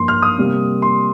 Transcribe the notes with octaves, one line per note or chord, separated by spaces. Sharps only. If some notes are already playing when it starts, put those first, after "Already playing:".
Already playing: G2 F3 A#3 C6
F6
D#6
C3 G3 A#3
C6